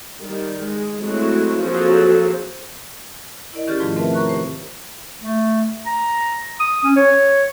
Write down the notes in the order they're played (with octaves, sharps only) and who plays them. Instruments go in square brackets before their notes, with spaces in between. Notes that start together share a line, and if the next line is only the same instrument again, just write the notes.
[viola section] D#3 G3
G#3
F#3 G#3 A3 C4 E4 F#4
F3 F#3 A#3 C4 G#4 A4
[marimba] E4 A#4 D5 D#5
D#3 C#4 G4 G#4 F6 A6
G#2 C3 F3 A3 F4 G#4
A3 C4 A#4 B4 E5 A5
A#4 C#5 A#5 C#6 F#6
G4 C5
[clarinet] A3
A#5
D#6
C#4
C#5